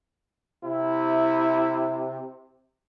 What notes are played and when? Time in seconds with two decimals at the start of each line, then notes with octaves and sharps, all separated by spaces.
0.64 C3 E4